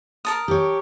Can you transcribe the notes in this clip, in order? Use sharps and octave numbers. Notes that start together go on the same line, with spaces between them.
A#4 A5 D#6
G4 C#5